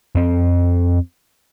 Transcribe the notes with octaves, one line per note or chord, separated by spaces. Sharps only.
F2 C4